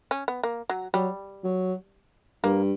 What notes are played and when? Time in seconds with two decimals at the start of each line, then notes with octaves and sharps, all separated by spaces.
0.11 C#4
0.28 B3
0.43 A#3
0.70 F#3
0.94 F#3 G3
1.44 F#3
2.44 G2 A#3